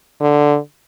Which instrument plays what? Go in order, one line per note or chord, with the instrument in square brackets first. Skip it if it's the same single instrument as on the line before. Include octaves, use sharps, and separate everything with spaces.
[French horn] D3